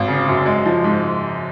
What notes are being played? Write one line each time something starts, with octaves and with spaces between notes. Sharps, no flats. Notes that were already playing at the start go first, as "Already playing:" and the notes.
Already playing: G#1
C#3
F#2
G#3
F3
G#2